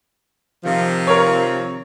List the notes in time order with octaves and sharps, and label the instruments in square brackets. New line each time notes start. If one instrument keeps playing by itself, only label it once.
[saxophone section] C3 D#3 F3
[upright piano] A#4 C#5